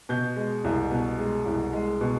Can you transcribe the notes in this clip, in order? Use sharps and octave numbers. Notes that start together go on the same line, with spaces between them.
B2 G6
G#3
C2
B2
G#3
C2
G#3
B2